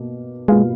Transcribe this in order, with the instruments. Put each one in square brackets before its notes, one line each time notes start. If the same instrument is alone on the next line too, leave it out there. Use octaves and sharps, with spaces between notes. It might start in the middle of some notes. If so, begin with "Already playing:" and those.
Already playing: [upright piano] B2 A#3
[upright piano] B2 A#3 F4 B4 F5 [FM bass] G#3